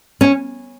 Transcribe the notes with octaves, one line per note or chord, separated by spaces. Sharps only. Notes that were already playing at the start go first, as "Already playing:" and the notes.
C#4